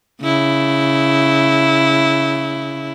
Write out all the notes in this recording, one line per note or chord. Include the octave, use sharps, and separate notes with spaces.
C#3 E4